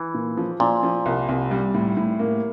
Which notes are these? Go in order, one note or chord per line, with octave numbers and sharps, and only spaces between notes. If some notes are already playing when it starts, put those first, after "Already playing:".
Already playing: E3
A#2
F3
A#2 F3
F3
C2
C2
G3
A2
A2
A#3